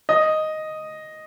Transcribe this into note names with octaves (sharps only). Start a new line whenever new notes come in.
D#5